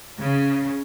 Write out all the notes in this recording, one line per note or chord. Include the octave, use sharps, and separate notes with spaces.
C#3